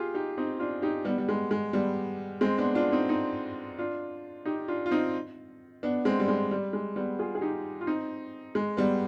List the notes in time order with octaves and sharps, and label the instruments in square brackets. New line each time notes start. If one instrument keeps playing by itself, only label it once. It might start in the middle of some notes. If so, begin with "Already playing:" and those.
Already playing: [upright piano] F4 G4 G#4
D#4 G4
C4 D#4
D4 F4
D#4 G4
G3 B3
G3
G#3
G#3
G3 B3
G#3 C4
B3 D4
D4 F4
C4 D#4
C4 D#4
D4 F4
D#4 G4
D4 F4
F4
C4 D#4
B3 D4
G#3 C4
G3
G#3
G3
G#3
G3 B3
F4 G#4
G#4
D#4 G4
F4
C4 D#4
G#3
G3 B3